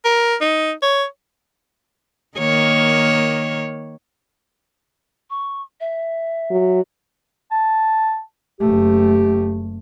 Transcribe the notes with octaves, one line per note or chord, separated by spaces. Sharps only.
A#4
D#4
C#5
D#3 A#3 C#5
C#6
E5
F#3
A5
F#1 A3 G4